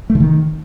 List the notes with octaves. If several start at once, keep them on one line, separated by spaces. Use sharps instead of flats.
A3
D3
D#3